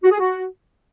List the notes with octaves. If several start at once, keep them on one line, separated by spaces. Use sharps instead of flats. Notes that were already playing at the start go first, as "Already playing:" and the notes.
F#4
G#4
F#4